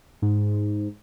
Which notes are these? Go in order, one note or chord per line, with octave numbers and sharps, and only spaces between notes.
G#2